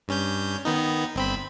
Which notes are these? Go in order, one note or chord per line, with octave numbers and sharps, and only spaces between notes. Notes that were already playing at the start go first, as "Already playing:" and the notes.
G2 C#4 G6
D#3 B3 D#4
G1 C4 B5